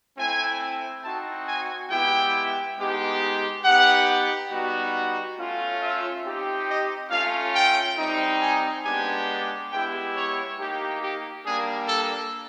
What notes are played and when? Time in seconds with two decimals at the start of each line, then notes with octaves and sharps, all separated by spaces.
0.17 A3 C4 E4 G#5
1.04 C4 D#4 F#4 A5
1.47 G#5
1.91 G#3 B3 E4 G4 G5
2.78 G#3 B3 D#4 G4
3.64 B3 D#4 G4 F#5
4.51 G3 B3 D#4 F#4
5.38 A3 C#4 F4
5.82 E5
6.24 C4 D#4 G4
6.68 D#5
7.11 A3 C#4 F4 F5
7.55 G5
7.99 G3 C4 D#4
8.41 G#5
8.85 G#3 B3 D4 G4 G#5
9.72 G#3 B3 E4 G4 G5
10.16 C#5
10.59 A#3 D#4 G4
11.02 G4
11.46 G3 A#3 D4 G#4
11.88 A4